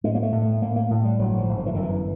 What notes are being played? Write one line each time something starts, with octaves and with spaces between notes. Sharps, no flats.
A2 G#3
A#3
A3
A2
A3
A2 A#3
A#3
A2
G3
G1 F#3
F3
G1
F3
E3
F#2 D#3
E3